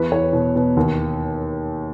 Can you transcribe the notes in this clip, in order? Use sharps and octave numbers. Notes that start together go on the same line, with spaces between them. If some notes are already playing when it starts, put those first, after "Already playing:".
Already playing: E2 B4
E2 C#5
B2
B2
D#2